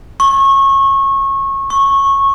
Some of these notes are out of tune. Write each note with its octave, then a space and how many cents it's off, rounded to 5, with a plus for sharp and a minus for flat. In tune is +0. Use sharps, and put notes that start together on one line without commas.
C#6 -25
C#6 -15